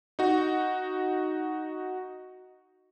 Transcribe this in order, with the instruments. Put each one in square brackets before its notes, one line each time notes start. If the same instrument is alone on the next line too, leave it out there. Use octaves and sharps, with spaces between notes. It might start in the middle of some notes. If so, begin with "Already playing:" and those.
[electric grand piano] D#4 F#4